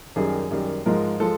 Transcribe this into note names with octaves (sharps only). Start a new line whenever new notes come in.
F#2 D#3 G3 G#4
F#2 D#3 G3
G#2 F3 G#3 A#4
F3 G#3 A4